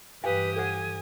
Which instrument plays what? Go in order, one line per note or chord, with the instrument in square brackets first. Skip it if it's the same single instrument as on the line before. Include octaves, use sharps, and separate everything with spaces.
[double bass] G2 E3 [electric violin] G4 D#6 [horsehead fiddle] B4 [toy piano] F5 G5 G#5
[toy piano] A4 C5 F#5 [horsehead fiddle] G#5